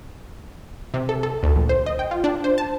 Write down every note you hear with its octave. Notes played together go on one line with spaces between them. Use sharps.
C3
A4
A4
D2
A#1
C5
D#5
G5
F4
D4
C5
A5